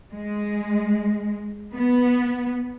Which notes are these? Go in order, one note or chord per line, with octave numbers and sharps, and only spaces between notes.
G#3
B3